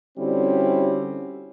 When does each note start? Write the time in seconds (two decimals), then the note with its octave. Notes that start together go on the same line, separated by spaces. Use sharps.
0.17 D3 G3 C4 C#4 E4 F#4